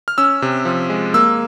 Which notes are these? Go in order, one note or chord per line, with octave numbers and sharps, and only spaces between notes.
F6
C#4 E6
C3
F3
G#3
A#3 E6